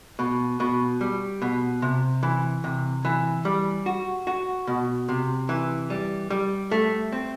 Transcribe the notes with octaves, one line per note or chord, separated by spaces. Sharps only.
B2
B2
G3
B2
C3
E3
C3
E3
G3
F#4
F#4
B2
C3
E3
G3
G3
A3
C4